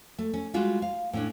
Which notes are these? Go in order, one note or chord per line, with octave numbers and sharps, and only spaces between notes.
A3
C#4
G3 G#3 F4 F#4
F5
A2 C#4 D4